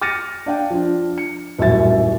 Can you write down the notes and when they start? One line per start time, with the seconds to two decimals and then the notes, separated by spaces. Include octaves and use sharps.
0.01 D6 F6 A6 A#6 C#7 D#7
0.46 D4 F5 G5
0.70 F3 D4
1.18 C#7
1.58 D#1 A1 F#2 F#3 E5 A6